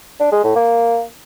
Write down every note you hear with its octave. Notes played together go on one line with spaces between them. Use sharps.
D4
G#3
A2
A#3